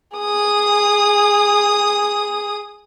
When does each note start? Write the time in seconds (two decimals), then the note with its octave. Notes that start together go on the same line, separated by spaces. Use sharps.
0.18 G#4 D#6